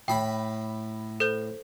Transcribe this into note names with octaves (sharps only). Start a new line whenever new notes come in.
A2 G5 B5
A4 C5 G6